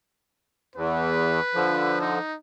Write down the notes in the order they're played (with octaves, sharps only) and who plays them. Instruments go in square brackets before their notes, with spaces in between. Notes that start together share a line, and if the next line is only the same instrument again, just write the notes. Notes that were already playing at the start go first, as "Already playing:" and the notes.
[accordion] E2 [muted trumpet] B4
[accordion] D3 F3
[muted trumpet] D#4